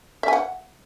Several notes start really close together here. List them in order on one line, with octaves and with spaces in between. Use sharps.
E5 G#5 F#5